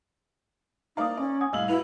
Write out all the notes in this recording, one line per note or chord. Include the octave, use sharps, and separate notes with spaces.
A#3 D#4 D5 F5 A#5 D#6
C#4 D5
F#5 G#5 D#6 G#6
C2 A2 D#5 F5 E6 F#7
E4 F#4 B4 F7